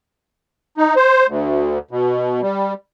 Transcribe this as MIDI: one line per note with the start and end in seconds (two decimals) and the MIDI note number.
0.77 0.94 63
0.96 1.27 72
1.28 1.78 38
1.91 2.41 47
2.42 2.73 55